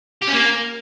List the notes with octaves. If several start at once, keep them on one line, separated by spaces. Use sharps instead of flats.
G4
C#4
A#3